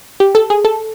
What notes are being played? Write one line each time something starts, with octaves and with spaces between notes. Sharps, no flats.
G4
A4
G#4
A4